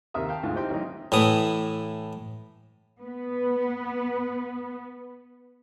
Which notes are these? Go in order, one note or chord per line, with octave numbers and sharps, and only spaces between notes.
D#2 C3 A#4 E5 D#6
F5 G5 A5
D2 G#2 D3 F4
C4 D#4 G4 E5 G5 C6
A1 F#3 D#4
A2 E3 D#6
B3 B4